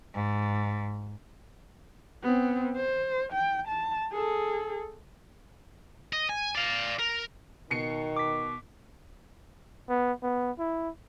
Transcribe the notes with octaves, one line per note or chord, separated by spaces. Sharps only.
G#2
B3 C4
C5
G5
A5
G#4 A4
D#5
G#5
D5 F5
A#4
B2 D#3 C7 C#7
D6 B6
B3
B3
E4